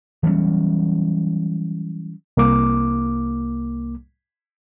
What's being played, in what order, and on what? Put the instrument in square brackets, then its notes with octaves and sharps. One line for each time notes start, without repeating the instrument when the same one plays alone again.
[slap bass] E3 F#3 G3 C#4
[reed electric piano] C2 A#3 D6